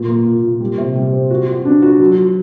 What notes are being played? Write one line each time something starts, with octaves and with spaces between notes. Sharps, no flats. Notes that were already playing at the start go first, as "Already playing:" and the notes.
Already playing: A#2
A#3
A#2
A#2
G3
C3
G3
C4
F#4
F#4
D4
F#4
F#3
F#3